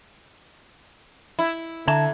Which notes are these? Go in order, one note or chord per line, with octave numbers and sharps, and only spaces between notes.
E4
D3 E5 A5 A#5 G#6